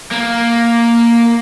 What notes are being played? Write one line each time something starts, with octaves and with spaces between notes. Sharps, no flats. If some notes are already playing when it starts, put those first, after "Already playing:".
A#3